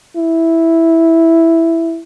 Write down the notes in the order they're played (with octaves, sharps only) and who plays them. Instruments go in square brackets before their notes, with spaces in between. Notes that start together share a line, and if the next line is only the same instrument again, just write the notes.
[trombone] E4